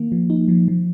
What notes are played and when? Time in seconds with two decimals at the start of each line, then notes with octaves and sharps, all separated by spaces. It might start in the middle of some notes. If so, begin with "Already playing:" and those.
Already playing: D#3 A#3
0.12 F3
0.30 D#4
0.48 F3
0.68 F3